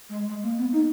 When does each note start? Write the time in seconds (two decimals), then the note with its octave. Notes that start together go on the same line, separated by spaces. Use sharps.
0.09 G#3
0.29 G#3
0.43 A#3
0.58 B3
0.73 D#4